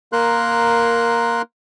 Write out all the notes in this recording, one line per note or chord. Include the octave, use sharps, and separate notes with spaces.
A#3 A#4 C6 F#6